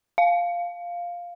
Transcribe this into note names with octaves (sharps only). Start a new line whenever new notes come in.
F5